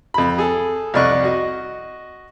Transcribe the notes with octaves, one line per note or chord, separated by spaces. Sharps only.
F2 B5
G#4 A4
C2 F2 D5 D#5 C#6 F#6
F#4 D#5